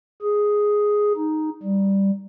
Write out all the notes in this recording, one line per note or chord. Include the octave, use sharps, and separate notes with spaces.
G#4
D#4
G3